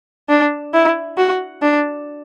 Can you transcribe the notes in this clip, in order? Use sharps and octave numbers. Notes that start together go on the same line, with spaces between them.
D4
E4
F#4
D4